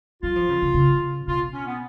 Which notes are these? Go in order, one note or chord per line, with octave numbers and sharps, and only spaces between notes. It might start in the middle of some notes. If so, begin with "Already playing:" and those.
F#3 F4
F3
C#3
C#3
C#3
B2 F4
C#4
B3